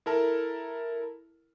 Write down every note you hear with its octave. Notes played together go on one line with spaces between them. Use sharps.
E4 A4 A#4 A5